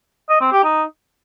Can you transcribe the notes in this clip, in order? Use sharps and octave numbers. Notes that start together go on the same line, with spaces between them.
D#5
C4
G4
D#4